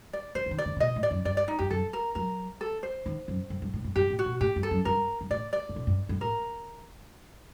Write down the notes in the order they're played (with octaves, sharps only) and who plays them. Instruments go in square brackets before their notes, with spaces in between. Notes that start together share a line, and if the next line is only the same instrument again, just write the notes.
[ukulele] D5
[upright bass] D3 [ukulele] C5
[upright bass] F#3
D#3
[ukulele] D5
[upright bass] D3
C3
[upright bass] A#2 [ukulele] D#5
[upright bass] A2
[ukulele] D5
[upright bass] F#2
[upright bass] G2 [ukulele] D5
[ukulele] D5
D#4
[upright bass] G2 [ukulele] G4
[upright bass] F#2 [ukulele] A4
[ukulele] A#4
[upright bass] F#3 [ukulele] A#4
[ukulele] A4
C5
[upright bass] D#3
F#2
G2
G2
A2
G2
[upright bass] G2 [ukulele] G4
[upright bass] A2
[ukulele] F#4
[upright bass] A#2
[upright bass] A2 [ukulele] G4
[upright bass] G2
[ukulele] A4
[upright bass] F#2
[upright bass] G2 [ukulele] A#4
[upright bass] G2
[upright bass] A2 [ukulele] D5
[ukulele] D5
[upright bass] A2
A#2
G2
G2
[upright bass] A2 [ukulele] A#4